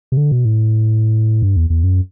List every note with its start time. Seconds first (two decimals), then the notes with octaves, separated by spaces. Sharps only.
0.12 C3
0.17 D3
0.31 B2
0.45 A2
1.42 G2
1.56 E2
1.70 E2
1.83 F#2